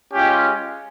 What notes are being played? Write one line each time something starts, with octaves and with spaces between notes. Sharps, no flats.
G#3 C#4 F4 G4